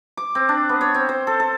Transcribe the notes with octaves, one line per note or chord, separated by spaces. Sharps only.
D6
C4
D4
B3
C#5
C4
C5
A4
A4